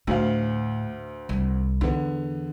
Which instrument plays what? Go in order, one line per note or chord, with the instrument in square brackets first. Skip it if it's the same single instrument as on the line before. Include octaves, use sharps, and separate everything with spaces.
[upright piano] D2 F5 [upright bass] A2
[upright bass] C2
[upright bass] E2 [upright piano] D3 B3